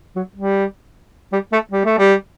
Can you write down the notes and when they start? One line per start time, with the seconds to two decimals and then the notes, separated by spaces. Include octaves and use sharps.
0.16 F#3
0.36 G3
1.33 G3
1.52 A3
1.71 G3
1.85 A3
1.99 G3